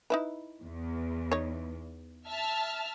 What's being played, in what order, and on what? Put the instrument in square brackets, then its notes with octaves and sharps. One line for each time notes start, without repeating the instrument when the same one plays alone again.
[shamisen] D#4 E4 B4
[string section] E2
[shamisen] D#4 C#5
[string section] E5 A5 F6